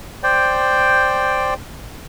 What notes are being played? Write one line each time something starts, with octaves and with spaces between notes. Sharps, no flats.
C5 D5 G5